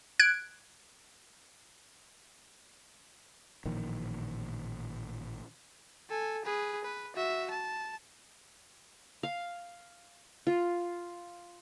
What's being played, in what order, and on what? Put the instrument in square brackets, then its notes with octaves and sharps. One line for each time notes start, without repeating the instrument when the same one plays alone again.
[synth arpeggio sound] F#6 G#6 D7
[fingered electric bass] A1 A#2 D#3 F3
[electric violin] A4 G#5
G#4 B4
B4
F#4 E5
A5
[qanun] F5
F4